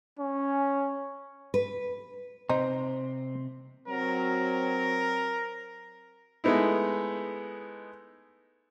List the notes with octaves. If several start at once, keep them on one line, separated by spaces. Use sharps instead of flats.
C#4
B4
C3 C4 D#4 C5
F#3 C4 A#4
G#3 A3 B3 D#4 E4